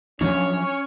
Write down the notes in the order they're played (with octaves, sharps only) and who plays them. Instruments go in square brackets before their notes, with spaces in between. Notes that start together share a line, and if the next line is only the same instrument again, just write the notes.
[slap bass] F3 F#3 D4 [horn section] C#4 [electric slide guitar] C#5